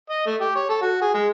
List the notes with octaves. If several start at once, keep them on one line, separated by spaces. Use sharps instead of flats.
D#5
A3
G4
C#5
A4
F#4
G#4
G#3